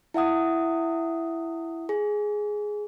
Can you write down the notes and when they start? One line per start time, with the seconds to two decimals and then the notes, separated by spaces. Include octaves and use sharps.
0.14 E4 E5 F#5 D#6
1.89 G#4